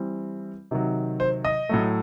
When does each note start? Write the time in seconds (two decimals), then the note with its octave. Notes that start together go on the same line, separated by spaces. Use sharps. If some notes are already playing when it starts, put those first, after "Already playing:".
Already playing: E3 G3 C4
0.71 C3 D#3 F#3
1.20 C5
1.45 D#5
1.69 A2 F#3 A3